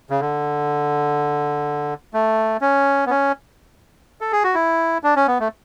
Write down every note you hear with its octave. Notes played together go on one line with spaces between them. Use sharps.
C#3
D3
A3
C#4
B3
C#4
A4
G#4
F#4
E4
D4
C#4
B3
A3